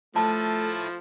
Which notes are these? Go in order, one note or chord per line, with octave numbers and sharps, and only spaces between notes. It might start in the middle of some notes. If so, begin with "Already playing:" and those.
F3 A3 E4 A4 A5